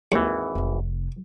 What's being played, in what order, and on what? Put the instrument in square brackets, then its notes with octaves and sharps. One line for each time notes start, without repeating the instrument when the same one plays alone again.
[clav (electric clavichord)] G#1 E3 [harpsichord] D#2
[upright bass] F1 C3